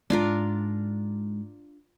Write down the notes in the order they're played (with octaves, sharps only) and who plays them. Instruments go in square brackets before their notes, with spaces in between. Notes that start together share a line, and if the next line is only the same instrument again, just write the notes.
[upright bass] G#2 [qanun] D4 F4 A#4